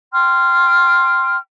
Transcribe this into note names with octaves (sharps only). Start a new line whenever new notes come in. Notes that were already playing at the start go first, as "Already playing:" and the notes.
G5 C6 F6